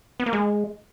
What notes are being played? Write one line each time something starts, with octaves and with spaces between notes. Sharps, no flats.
B3
A#3
G#3